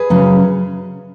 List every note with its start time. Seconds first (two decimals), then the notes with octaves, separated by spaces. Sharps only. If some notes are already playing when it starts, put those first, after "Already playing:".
Already playing: G#4 B4
0.10 F#2 C#3 F#3 C#4